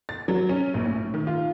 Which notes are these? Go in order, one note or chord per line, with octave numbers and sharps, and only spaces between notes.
A6
F#3
C#4
A#1
A2
D#3
F4